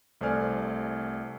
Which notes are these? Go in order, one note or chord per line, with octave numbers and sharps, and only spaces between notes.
C2 A3 C5 D5 G#5 F6